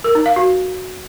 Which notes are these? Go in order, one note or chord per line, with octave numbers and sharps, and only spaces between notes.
A#4
D#4
F5
F#4